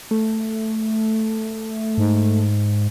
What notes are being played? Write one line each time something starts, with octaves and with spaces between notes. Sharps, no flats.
A3
G#2